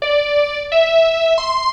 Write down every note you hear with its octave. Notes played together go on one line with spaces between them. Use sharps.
D5
E5
C6